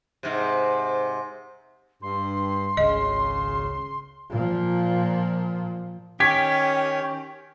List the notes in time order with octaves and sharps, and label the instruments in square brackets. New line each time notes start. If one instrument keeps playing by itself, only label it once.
[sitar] G#2 C3
[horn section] G2 [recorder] C6
[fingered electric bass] G#1 C#2 [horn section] C#3 [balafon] D#5
[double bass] A#2 F3
[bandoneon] D#3 C#4 C#5 [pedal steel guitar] G4 [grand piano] G#6 B6